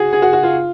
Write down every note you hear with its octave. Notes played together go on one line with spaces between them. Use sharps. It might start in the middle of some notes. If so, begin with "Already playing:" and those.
Already playing: F#4 G#4
G#4
F#4
F#4
F4